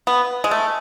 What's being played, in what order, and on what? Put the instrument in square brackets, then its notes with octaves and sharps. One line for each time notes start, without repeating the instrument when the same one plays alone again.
[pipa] B3
G#3
A3